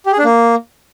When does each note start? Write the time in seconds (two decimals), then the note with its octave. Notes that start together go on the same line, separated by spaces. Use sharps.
0.06 G4
0.12 G#4
0.18 D4
0.24 A#3